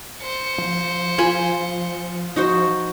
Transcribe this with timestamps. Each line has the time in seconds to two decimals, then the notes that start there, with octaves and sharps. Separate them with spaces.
0.21 C5 C#7
0.58 F3
1.18 F4 G#5 B5
2.36 D#4 F#4 C5